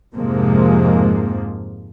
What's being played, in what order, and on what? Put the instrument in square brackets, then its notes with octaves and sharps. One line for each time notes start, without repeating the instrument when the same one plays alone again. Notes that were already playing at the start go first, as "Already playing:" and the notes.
[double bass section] F2 G#2 C3 F3 G#3 A#3